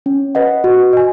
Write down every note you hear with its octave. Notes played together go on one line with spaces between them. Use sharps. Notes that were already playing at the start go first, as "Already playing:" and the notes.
C#4
B4 D#5 F#5
F#4
D#5 G#5